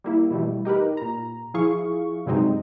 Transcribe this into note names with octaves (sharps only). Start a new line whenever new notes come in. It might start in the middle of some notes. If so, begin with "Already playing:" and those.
G3 A#3 E4
B2 E3 G3 A3
D#4 G4 A#4 B4
A#2 A#5
F3 E4 G#4 F5 C#6
G2 C3 F#3 G#3 C4 D#4